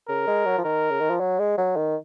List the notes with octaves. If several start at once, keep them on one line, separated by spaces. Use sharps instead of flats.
C#3 A#4
G#3
F#3
F3
D#3 A#4
C#3
D#3
F3
F#3
G#3
F#3
D#3